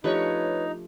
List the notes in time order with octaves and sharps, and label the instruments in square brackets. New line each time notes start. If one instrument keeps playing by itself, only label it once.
[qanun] F3 A3 D4 [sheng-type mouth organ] D#4 [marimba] G4 [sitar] B4 C#5